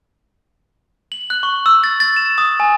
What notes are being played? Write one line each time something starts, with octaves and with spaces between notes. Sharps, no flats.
F#7
F#6
C#6
E6
A6
A6
E7
D#6
G#5